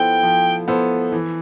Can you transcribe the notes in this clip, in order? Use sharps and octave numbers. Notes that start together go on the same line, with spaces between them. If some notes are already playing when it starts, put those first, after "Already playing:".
Already playing: F3 B3 E4 A4 C5 G5
F3
B3 E4 A4 C5
E3